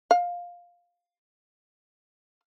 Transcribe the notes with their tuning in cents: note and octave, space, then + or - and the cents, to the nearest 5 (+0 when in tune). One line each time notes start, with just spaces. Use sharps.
F5 +10